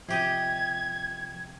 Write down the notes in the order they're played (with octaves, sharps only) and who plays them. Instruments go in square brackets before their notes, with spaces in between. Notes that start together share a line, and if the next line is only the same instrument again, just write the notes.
[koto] C3 G4 D#5 [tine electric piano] F3 [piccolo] G#6